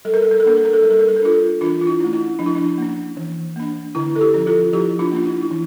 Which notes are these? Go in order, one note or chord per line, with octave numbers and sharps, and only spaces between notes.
G3 A4
A#4
A4
A#4
A4
A#3 D4 A#4
A4
A#4
A4
G3 A#4
A4
A#4
A4
A#4
D4 F4 A4
E3 D4 F4
F4
E4
A3 C#4
E4
F3 D4
E4
D4
A#3 C#4
E3
A#3 D4
D3 E4
A4
E4 G4
F3 C#4
F4 A4
F3 E4 G4
D4 F4
A#3 C#4 D4
E4
E4
E3